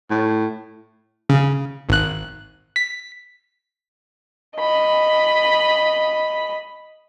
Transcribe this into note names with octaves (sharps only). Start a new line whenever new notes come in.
A2
C#3
G#1 F#6
B6
D#5 B5